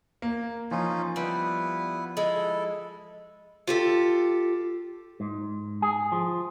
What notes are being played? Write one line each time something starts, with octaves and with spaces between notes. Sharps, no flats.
A#3
F3 C#4 D#4 F4
G3 B3 E4 B4
G#3 E4 A4
F4 G4 A4
G#2
G#4
F3